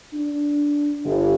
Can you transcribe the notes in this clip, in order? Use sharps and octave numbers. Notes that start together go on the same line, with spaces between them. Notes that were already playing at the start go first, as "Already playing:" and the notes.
D4
G1